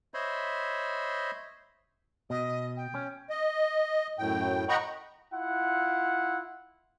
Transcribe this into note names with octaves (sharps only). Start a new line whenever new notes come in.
C5 C#5 D#5 E5 B5 C6
B2 D#5
G5
C#4
D#5
F#2 A2 G5
D#5 F#5 G5 A#5 B5 C#6
E4 F4 F#5